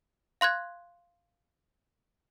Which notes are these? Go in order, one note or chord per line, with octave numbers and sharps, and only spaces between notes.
F5 C6 F#6 G#6